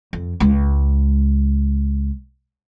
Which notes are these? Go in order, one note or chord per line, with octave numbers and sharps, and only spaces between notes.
F2
C#2 G#3